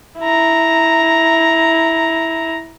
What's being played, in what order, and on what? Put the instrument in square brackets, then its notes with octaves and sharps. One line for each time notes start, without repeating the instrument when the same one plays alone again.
[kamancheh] E4 A#5